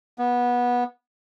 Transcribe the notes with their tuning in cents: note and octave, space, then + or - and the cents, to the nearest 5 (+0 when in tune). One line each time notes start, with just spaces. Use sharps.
B3 -20